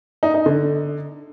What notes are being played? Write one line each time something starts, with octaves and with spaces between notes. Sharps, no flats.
D#4
D#4
D3